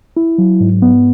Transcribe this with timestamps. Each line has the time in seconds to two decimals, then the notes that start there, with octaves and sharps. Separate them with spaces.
0.17 E4
0.38 F#3
0.60 G#2
0.82 B3